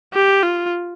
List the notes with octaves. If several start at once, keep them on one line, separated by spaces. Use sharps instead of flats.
G4
F4